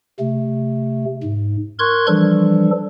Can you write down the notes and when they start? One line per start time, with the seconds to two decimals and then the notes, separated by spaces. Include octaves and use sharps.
0.20 C3 A3
1.23 G#2
1.79 A#4 C6 C#6 F#6 G#6
2.08 E3 F3 G3 D4 A4